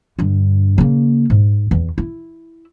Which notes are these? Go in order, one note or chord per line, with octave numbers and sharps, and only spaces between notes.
G2 D3
C#3 A#3
G#2
E2
E4